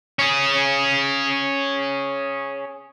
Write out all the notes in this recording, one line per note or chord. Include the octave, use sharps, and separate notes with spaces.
C#4 G#4